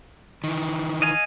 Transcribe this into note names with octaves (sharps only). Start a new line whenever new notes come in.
D#3 E3
D#5 F5 G#5